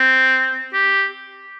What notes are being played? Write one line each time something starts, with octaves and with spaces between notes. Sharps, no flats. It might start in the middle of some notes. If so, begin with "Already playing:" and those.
Already playing: C4
G4